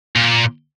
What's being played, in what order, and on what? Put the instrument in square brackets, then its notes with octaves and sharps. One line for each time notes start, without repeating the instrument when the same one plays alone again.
[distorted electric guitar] A#2